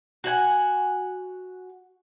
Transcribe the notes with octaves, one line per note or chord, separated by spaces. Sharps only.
F#4 F#5 G#5